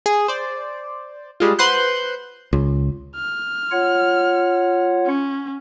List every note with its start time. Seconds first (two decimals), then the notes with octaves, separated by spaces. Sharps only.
0.06 G#4
0.28 C5 D5
1.40 G3 G#3 F4
1.59 B4 C5 F#5 C6 F#6 G6
2.53 C#2
3.16 F6
3.71 F4 C#5 F#5
5.06 C#4